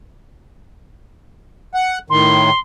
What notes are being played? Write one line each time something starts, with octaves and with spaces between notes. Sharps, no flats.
F#5
A2 D#3 C6